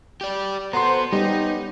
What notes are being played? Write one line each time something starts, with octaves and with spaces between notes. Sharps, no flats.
G4 D5
B3 F#4 A4 C5 A#5 C6
G3 B3 C#4 D#4 G4